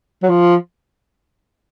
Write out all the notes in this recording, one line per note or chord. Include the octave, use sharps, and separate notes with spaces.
F#3
F3